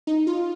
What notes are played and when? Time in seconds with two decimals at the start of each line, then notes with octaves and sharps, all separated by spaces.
0.07 D#4
0.27 F4